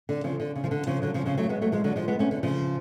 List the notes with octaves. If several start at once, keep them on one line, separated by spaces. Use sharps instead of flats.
D3
C#3 F3
D3
C#3
F3
D3
C#3 F3
D3 F#3
C#3 F3
C#3 F3
F#3 A3
G#3 B3
F#3 A3
F3 G#3
D3 F#3
F3 G#3
G#3 B3
A3 C#4
D3
C#3 F3